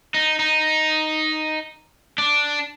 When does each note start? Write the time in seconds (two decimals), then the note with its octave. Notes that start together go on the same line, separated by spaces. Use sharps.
0.14 D#4
0.40 D#4
2.18 D4